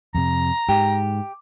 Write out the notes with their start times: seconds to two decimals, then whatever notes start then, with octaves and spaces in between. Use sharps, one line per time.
0.15 F2 C3 A#5
0.69 G#2 G4